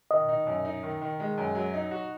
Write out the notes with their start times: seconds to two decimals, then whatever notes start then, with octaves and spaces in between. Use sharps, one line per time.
0.11 D#3 D#5
0.29 D#4
0.47 F#2
0.65 D#4
0.83 D#3
1.01 D#3
1.20 G#3
1.37 F#2
1.55 F#3
1.74 D#4
1.91 F#4